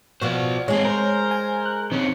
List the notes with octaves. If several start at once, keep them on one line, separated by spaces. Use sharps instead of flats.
B2 F3 F#4 C5 D5
G#2 G#3 C4 G#4 C#5
A#4 C5
G#5
F#6
D#3 C4 C#4